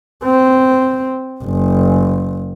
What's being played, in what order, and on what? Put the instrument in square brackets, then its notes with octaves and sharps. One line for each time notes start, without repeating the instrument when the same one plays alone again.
[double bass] C4
F#1